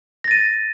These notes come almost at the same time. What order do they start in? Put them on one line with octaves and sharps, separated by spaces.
A#6 A6 D#7